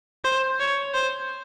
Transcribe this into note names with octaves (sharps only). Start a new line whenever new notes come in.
C5
C#5
C5